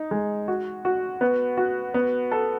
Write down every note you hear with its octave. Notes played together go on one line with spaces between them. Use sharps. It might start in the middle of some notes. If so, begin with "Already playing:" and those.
Already playing: D#4
G#3
F#4
F#4
B3
F#4
B3
A4